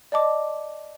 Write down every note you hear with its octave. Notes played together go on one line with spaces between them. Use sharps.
D5 D#5 A5 D6